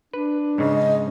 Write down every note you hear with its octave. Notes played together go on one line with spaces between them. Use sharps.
D4 B4
G#2 C#3 D#5